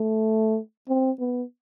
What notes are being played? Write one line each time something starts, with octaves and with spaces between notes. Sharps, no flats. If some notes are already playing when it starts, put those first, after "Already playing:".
Already playing: A3
C4
B3